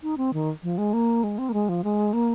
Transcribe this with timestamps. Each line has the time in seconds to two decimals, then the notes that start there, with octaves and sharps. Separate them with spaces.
0.03 D#4
0.17 C4
0.33 D#3
0.63 F3
0.78 G#3
0.93 A#3
1.23 G#3
1.38 C4
1.49 A#3
1.53 G#3
1.69 F3
1.84 G#3
2.13 A#3